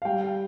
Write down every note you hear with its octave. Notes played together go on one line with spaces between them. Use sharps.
F5
G3 G5